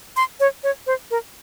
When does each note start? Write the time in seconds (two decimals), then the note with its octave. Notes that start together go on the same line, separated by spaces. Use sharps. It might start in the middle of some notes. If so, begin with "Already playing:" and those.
0.17 C6
0.40 C#5
0.64 C#5
0.87 C5
1.11 A#4